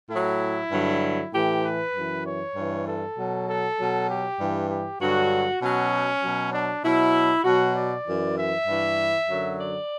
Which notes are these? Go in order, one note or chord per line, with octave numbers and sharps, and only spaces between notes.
A2 F#3 E4
G2 D3 F#3
A2 E3 G4
B4
F#2 E3
C#5
G2 E3
A4
B2 F#3
A4
B2 F#3
G4
G2 E3
G4
G2 D3 F#3 F#4
B2 F#3 C#4
B2 F#3
D4
B2 F#3 E4
B2 F#3 F#4
D5
F#2 E3
E5
G2 E3
F#2 D3 F#3
D5